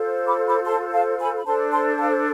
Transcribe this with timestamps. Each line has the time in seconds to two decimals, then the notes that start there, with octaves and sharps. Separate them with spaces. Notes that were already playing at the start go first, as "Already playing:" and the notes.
Already playing: F4 A4 C5
0.27 B5 D6
0.47 B5 D6
0.67 A5 C6
0.93 F5 A5
1.19 G#5 B5
1.39 B5
1.45 D4 A4 C5 A5 C6
1.72 A5 C6
1.98 F5 A5